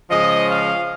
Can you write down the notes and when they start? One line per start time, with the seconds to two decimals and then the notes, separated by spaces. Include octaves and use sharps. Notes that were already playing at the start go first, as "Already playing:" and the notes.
0.10 C#3 F3 G#3 D#5
0.49 F5